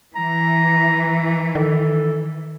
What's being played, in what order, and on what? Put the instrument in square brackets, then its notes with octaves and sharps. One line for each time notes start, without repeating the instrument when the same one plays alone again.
[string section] E3 [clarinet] A#5
[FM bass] D#3 [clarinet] A4